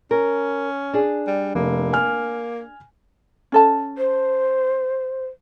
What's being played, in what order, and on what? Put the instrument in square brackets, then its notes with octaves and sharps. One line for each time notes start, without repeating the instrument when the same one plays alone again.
[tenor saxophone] C#4 [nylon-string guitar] A#4
[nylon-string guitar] D4 G#4
[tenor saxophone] G3
[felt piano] F1 [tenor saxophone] A#3
[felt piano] G#5 F6
[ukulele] C#4 A4 A5
[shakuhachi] C5